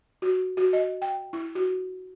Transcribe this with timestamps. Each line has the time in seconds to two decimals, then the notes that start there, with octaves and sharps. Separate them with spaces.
0.22 F#4
0.57 F#4
0.73 D#5
1.02 G5
1.33 E4
1.55 F#4